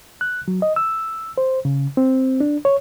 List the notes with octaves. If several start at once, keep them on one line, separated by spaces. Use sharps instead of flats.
F#6
F#3
D#5
E6
C5
C#3
C4
D4
C#5